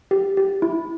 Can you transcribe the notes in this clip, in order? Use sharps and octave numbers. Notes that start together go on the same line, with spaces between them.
G4
G4
E4